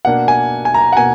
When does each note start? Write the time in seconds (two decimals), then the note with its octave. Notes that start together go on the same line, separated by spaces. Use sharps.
0.05 B2 A#3 D4 F#5
0.28 G#5
0.65 G#5
0.74 A#5
0.93 F#5
0.97 B2 A#3 G#5